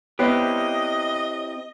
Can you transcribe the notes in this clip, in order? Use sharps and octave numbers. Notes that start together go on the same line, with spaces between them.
B3 C4 E4 G4 C#5 D#5 F#6 C7